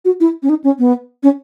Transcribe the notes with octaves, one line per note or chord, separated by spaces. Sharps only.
F#4
E4
C#4
D#4
C#4
B3
C#4